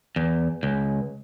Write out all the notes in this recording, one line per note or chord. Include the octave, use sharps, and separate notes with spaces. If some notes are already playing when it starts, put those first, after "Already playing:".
E2
C#2